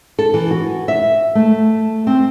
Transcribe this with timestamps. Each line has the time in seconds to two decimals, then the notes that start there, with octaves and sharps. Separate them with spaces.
0.19 A4
0.34 E3
0.51 F#4
0.88 E5
1.35 A3
2.07 C4